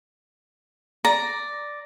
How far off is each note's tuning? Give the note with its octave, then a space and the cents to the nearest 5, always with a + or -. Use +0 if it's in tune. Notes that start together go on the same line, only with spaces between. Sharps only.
D5 +0 A#5 +0